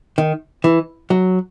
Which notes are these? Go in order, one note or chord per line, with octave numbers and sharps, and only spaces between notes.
D#3
E3
F#3